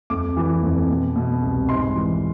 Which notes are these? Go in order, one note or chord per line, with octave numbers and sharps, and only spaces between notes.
F2 D6
E3
F2
B2
B2
C2
G#2 C6
E3